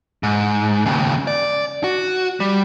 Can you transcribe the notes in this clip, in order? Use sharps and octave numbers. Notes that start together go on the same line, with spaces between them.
G#2
D#2 C#3
D5
F#4
G3